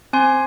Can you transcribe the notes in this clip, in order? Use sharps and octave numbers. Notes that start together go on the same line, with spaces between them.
C4 G#5 C6